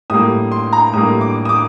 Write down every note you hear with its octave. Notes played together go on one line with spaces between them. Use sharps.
A2 G3 A#3 D#6
C6
A#5
A2 G3 A#3 D#6
D6
D#6
D6